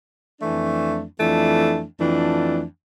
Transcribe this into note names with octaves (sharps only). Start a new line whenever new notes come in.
F2 E3 A3 D4
F2 E3 A3 D4
F2 E3 A3 D4